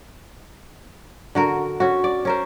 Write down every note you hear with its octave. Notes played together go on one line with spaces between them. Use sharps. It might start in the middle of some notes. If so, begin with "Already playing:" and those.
D3 F#4 A#4
C#4 F#4
D5
C#4 A#4 C5